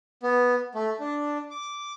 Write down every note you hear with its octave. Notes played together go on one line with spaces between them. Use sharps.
B3
A3
D4
D6